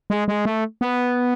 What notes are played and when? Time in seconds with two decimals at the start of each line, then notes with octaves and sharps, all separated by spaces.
0.10 G#3
0.28 G#3
0.45 A3
0.81 B3